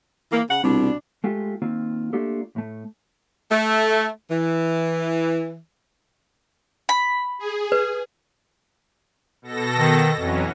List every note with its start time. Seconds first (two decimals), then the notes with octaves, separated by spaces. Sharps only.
0.32 E3 A#3
0.50 C#3 F#5
0.63 C2 B2 D4
1.24 G#3 A3 F4 G4
1.62 D#3 A#3 C4 F4
2.13 A3 A#3 D4 F4 G4 A4
2.56 A2 A3
3.51 A3
4.30 E3
6.89 B5
7.39 G#4
7.72 B4
9.42 B2 A4 A#6
9.79 D#3
10.18 F2 E3 F#3 C#4